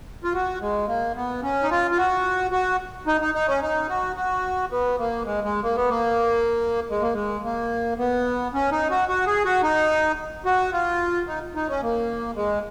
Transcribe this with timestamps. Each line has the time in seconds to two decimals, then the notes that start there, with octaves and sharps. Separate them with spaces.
0.24 F4
0.34 F#4
0.61 G#3
0.88 A#3
1.16 B3
1.43 C#4
1.63 D#4
1.71 F4
1.91 F4
1.97 F#4
2.52 F#4
3.07 D#4
3.21 D#4
3.34 D#4
3.48 C#4
3.62 D#4
3.88 F#4
4.16 F#4
4.71 B3
4.98 A#3
5.26 G#3
5.44 G#3
5.63 A#3
5.76 B3
5.89 A#3
6.90 G#3
7.02 A#3
7.14 G#3
7.45 A#3
7.98 B3
8.54 C#4
8.71 D#4
8.90 F#4
9.09 F#4
9.26 G#4
9.45 F#4
9.63 D#4
10.46 F#4
10.73 F4
11.27 D#4
11.55 D#4
11.69 C#4
11.82 A#3
12.36 G#3